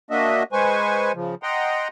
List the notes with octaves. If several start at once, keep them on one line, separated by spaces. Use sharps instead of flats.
A#3 D4 F#4 D#5 E5
G#3 B4 C5 G#5 C#6
C#3 F3
D#5 F#5 G5 A#5 C6